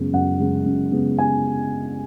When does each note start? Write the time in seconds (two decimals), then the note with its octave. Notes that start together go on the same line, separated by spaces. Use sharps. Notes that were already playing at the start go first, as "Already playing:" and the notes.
Already playing: F#2 C#3 G#3 B3
0.13 F#2 F#5
0.39 C#3 G#3 B3
0.66 F#2
0.92 C#3 G#3 B3
1.18 G#5